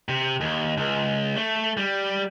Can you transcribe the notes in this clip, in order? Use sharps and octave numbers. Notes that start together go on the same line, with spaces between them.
C3
D#2
C#2
A3
G3